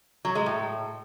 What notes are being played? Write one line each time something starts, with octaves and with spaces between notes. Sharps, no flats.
F#3
G#3
A2